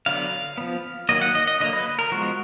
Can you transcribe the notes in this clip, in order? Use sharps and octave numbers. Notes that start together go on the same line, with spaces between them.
D3 F#3 B3 F5
F3 B3
D#3 F#3 A#3 D#5
F#5
D#5
D#5
D3 F#3 A#3 D#5
B4
A#4
F3 G#3 B3 F#4